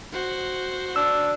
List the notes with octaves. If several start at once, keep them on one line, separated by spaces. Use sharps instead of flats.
F#4 C5
D4 E6